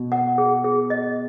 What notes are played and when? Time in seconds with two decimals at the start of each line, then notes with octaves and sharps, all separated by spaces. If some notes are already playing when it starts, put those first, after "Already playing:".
Already playing: B2
0.12 F#5
0.38 G#4
0.64 G#4
0.90 D#5